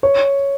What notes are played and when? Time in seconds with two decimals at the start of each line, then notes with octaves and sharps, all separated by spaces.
0.03 C#5